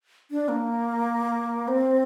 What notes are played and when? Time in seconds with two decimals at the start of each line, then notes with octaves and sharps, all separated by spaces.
0.31 D4
0.49 A#3
1.68 C4